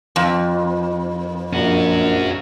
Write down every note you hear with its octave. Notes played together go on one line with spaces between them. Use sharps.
F2
A#1 C#4 F#4